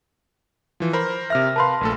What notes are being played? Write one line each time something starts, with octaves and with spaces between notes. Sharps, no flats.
E3 F3
A#4 C5 B5
C3 E5 F6 A#6
A#4 B4 F5 A5 B5 C6
A#1 A3 A4